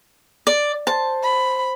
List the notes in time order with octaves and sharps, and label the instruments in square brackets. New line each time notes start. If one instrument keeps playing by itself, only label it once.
[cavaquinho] D5
[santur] C5 [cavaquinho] A5
[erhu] B5